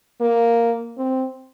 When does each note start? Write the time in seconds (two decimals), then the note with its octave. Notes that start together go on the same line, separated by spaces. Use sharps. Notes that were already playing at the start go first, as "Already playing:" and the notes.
0.21 A#3
0.98 C4